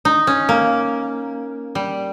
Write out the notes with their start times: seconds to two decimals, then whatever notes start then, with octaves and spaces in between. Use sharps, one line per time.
0.05 D#4
0.27 C#4
0.49 A#3
1.75 G3